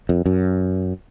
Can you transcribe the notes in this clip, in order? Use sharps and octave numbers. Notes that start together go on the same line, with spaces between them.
F2
F#2